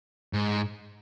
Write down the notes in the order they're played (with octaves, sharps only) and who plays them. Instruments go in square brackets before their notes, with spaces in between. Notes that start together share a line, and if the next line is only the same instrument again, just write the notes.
[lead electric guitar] G#2